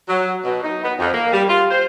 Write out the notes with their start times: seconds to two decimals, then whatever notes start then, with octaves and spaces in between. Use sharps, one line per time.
0.08 F#3
0.44 B2
0.63 D#4
0.83 B3
0.97 F2
1.13 A#3
1.32 G3
1.49 F4
1.70 C5